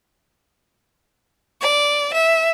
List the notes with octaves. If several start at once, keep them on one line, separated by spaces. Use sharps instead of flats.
D5
E5